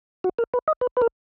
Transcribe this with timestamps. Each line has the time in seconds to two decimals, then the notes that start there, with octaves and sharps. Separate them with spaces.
0.24 F#4
0.38 A#4
0.54 B4
0.68 D#5
0.81 B4
0.97 B4
1.02 A#4